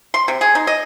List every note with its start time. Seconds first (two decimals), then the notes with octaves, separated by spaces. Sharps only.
0.14 C6
0.28 C3
0.41 G#4
0.55 D#4
0.67 D#5